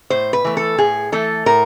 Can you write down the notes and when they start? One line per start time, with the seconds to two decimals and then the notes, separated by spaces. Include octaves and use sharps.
0.10 A2 C5
0.33 B4
0.44 E3 A3
0.57 A4
0.78 A2 G#4
1.12 E3 A3 A4
1.46 A2 A#4